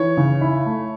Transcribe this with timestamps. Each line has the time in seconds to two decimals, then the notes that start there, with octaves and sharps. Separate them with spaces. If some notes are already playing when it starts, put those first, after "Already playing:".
Already playing: E3 C#5
0.17 C#3
0.41 E4
0.66 A3